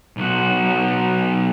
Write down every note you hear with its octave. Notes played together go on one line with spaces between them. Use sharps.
B1 F#4